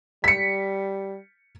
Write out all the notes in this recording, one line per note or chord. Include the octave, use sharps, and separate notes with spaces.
G3 B6 C#7